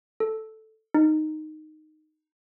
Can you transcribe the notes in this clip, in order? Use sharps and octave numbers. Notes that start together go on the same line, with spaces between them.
A4
D#4